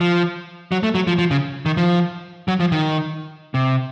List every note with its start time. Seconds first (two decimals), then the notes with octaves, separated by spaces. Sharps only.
0.01 F3
0.72 F#3
0.83 A3
0.95 F#3
1.07 F3
1.19 F3
1.31 C#3
1.66 D#3
1.77 F3
2.48 F#3
2.60 F3
2.72 D#3
3.54 C3